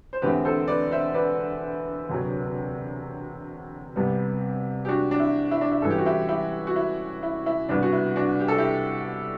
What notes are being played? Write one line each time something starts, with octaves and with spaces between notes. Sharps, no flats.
C5
E1 E2 D3 A3 C4 G4 B4
A4 C5
B4 D5
C5 E5
B4 D5
E1 D2 C3 F#3
C2 C3 G3 B3
G4
D4 F#4
D4
E4
E4
D4
E4
A1 A2 E3 G3 A4
G4
F#4
E4 G4
E4 G4
F#4
E4
E4
E4
C2 B2 G3 B3 D4
F#4
E4
D4 F#4
G4
A4
E4 G4